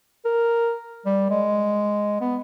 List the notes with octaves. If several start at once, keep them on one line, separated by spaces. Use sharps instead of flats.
A#4
G3
G#3
B3